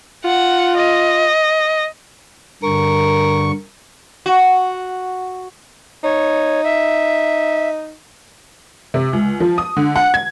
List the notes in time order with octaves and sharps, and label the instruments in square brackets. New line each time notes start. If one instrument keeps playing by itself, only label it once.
[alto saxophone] F4 [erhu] F#5
[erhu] D#5
[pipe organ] G2 D3 C#6 [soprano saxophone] A#4
[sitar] F#4
[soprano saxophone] D#4 [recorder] C#5
[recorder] E5
[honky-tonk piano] C3
C#2
F3
D#6
D3
F#5
G#6